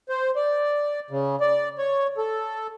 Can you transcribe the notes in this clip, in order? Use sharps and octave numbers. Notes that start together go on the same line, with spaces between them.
C5
D5
C#3
D5
C#5
A4